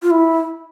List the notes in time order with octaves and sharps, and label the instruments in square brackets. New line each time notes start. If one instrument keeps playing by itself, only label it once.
[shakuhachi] F4
E4